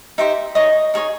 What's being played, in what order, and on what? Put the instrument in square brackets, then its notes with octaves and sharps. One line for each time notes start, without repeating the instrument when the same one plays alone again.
[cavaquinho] D#4 G4 C5 E5
D#4 G#4 C#5 D#5
D#4 G#4 C#5